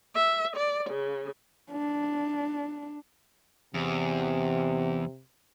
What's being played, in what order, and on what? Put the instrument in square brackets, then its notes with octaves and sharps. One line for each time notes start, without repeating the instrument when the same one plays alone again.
[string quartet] E5
D5
C#3
[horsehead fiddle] D4
[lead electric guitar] E2 [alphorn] C3